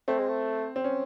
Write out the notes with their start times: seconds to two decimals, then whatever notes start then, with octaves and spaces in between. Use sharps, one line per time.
0.08 A3 C4
0.18 G#3
0.28 A3
0.76 C4
0.84 C#4